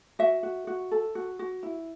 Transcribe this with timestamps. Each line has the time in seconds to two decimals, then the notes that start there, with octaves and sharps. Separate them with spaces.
0.19 F#4 E5
0.43 F#4
0.67 F#4
0.91 A4
1.15 F#4
1.39 F#4
1.63 E4